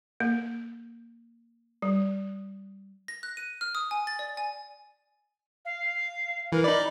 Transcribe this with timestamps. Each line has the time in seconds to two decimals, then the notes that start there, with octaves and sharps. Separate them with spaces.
0.20 A#3
1.82 G3
3.08 A#6
3.23 F#6
3.37 D#7
3.61 F6
3.75 D#6
3.91 G#5
4.07 A6
4.19 D5
4.37 G#5
5.65 F5
6.52 E3 A#4
6.64 D#4 D5 B5